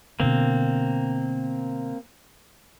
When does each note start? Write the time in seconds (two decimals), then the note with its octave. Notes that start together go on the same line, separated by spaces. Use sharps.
0.20 B2 D3 A#3 C4